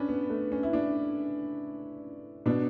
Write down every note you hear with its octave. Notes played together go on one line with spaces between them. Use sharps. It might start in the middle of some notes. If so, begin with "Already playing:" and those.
Already playing: C#4 D4 B4
B3
A3
C#4
E4
D4
B2 D4